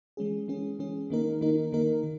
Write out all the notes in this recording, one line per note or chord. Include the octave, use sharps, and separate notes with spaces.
E3 G#3 C#4 G#4
E3 G#3 C#4 G#4
E3 G#3 C#4 G#4
D#3 A#3 D#4 A#4
D#3 A#3 D#4 A#4
D#3 A#3 D#4 A#4
D#3